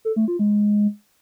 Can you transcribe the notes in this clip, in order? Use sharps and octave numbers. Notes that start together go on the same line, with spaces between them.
A4
A3
F4
G#3